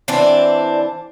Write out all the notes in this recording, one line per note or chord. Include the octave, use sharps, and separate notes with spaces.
E3 C4 D4 D5